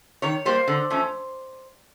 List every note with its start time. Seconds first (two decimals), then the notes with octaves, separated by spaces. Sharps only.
0.22 D#3 C#5
0.45 G3 A#3 C5
0.67 D3
0.90 F3 A3 C#4